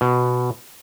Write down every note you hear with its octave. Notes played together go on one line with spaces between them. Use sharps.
B2